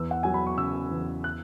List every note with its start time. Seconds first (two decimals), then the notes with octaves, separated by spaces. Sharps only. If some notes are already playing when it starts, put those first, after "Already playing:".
Already playing: E2 E6
0.11 F#5
0.23 F#3 G#5
0.34 B5
0.47 C#6
0.58 C#3 E6
0.91 E2
1.24 F#6